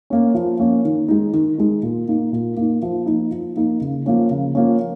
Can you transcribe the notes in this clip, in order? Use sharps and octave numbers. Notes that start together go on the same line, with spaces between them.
A#3 C#4
F3
A#3 C#4
D#3
G#3 D#4
D#3
G#3 D#4
A#2
A#3 D#4
A#2
A#3 D#4
F3
A#3 D#4
F3
A#3 D#4
C#3
F3 A#3 C#4
C#3
F3 A#3 C#4